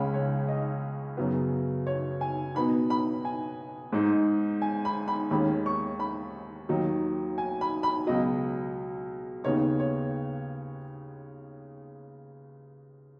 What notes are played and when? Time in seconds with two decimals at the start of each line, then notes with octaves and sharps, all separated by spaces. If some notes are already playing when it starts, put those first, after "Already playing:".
Already playing: C#2 C#3 G#3 C#4 B5
0.14 C#5
0.48 D#5
1.17 F#2 C#3 F#3 B3
1.87 C#5
2.21 G#5
2.55 B2 B3 D#4 B5
2.90 B5
3.25 G#5
3.93 G#2 G#3 D#4
4.62 G#5
4.85 B5
5.08 B5
5.31 D#2 D#3 G#3 C#4 B5
5.66 C#6
6.00 B5
6.69 D#2 D#3 F#3 D#4
7.38 G#5
7.61 B5
7.83 B5
8.07 C#2 B2 F#3 D#5
9.44 D#2 C#3 B3 D#4 C#5
9.79 C#5